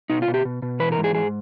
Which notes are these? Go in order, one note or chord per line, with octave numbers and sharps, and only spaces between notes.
B2 D#4
F4
B2
G4
B2
B2
E3 B4
A#4
G#2
G#4
G#2 G#4